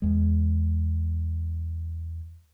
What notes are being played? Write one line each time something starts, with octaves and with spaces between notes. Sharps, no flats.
E2 G#3